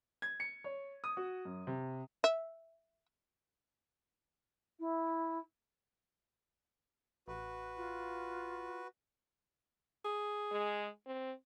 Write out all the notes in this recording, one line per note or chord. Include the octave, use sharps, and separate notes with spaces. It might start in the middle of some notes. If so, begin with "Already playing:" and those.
G#6
C#7
C#5
D#6
F#4
F#2
C3
E5
E4
A1 F#4 B4
F4
G#4
G#3
C4